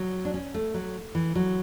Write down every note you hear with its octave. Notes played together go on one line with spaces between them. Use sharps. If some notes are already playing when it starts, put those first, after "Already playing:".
Already playing: F#3
D4
C#4
A3
F#3
E3
F#3